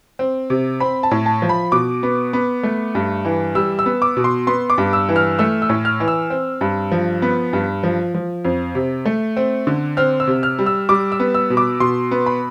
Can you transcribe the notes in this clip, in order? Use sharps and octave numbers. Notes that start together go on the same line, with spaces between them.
C4
C3
C4 B5
A5
A2
A5
F3
B5
B2 D6
B3
B3
A3
G2
E3
G3 E6
E6
B3
D6
B2
C6
B3 C6
D6
G2
E6
E3
F6
A3 E6
E6
A2
F6
E3
E6
C4
G2
F3
B3
G2
F3
F3
F2
C3
A3
C4
D3
C4 F6
E6
C3
F6
G3
E6
G3 D6
E6
B3
E6
B2
D6
B2 C6
B3
B5